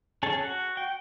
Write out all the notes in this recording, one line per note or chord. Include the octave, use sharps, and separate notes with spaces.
C#4 G#4 A4 A5
F#4
G5